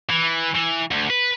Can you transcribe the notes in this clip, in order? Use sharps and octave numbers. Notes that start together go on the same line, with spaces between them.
E3
E3
D2
B4